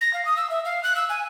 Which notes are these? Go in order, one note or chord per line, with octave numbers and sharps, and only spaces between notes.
A#6
F5
D#6
E6
E5
F5
F#6
E6
G#5